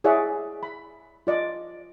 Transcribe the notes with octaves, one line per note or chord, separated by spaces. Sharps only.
E4 G#4 C#5 D5 E5 F#5
B5
F4 D5 D#5